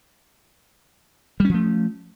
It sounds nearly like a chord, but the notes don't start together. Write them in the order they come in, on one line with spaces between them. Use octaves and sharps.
G3 C#4 F3 A3